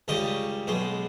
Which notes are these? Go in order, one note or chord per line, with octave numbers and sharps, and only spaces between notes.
C#2 C#3 G3 D#5
B1 B2 G#3